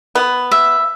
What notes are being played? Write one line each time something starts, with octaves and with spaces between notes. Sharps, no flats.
B3
E5